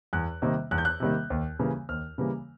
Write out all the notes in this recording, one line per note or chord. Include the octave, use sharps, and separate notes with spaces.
E2 F#6
C3 D#3 G3 A#3
E2 F#6
G6
F#6
C3 D#3 G3 A#3
D#2
C#3 E3 G3 A#3
D#2 F6
C#3 E3 G3 A#3